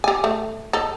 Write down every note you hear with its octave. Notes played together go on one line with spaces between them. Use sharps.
G4 G#5
A3
D#4 A4